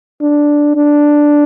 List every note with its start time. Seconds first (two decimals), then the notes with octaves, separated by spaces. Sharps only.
0.22 D4
0.76 D4